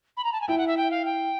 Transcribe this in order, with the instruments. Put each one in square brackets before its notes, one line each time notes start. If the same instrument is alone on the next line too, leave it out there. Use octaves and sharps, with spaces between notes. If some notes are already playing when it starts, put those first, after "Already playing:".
[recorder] B5
A#5
A5
G#5
[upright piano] E4 [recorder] G5
[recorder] F#5
E5
G5
F5
G5